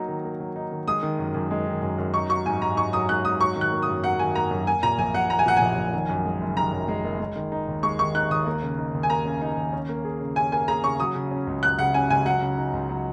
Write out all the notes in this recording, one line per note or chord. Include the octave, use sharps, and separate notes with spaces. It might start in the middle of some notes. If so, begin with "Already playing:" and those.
Already playing: F#3 A#3 D#4
D#3
A#3
F#3
D#4
D#3
G#3 D#6
D#3
F#2
F#2
G#3
D#3
F#2
F#2
D#4 C#6
F#3 C#6
G#2 G#5
G#2 A#5
D#4 C#6
F#3 D#6
G#2 F#6
G#2 D#6
F#3 C#6
D#3
F#6
A#3
D#6
F#2
F#3 F#5
D#3 G#5
A#3 A#5
F#2
A#3 G#5
A#2 A#5
A#1 G#5
A#1 F#5
A#3 A#5
G#5
A#2 F#5
A#1 G#5
A#1
D#3
F#2
G#3
F#1
D#3 A#5
F#2
G#3
F#1
G#3
D#3
D#4
D#2
G#3 C#6
D#3 C#6
D#4 F#6
D#2 D#6
A#3
C#3
D#4
D#2
G#5
A#3 A#5
C#3
D#4
D#2
C#4
A#3
G#4
C#3
C#4 G#5
A#3 G#5
G#4 A#5
C#3 C#6
F#3 D#6
C#3
C#4
C#2
F#3 F#6
C#3 F#5
C#4 G#5
C#2 G#5
F#3 F#5
C#3
D#4
C#2
F#3